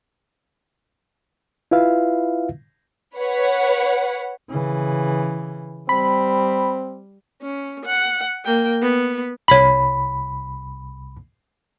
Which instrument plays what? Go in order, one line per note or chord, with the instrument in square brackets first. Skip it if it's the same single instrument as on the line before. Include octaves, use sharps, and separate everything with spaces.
[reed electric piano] E4 F4 B4 E5 F5
[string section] B4 C#5 F#5
[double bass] C#3 E3
[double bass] G3 [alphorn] C4 [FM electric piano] B5
[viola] C#4
F#5
A#3 G5
B3
[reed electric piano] C2 B5 [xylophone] C#5 B6 F#7